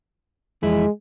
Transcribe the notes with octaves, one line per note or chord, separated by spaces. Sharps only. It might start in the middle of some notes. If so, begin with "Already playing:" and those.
F2 E3 G#3 E4